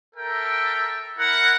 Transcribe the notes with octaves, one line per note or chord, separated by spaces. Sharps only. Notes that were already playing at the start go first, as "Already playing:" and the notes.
A4 A#4 E5 G5
E4 A#4 F#5